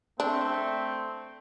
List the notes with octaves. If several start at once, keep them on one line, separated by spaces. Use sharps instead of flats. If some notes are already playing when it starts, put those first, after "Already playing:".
A3 C4 D4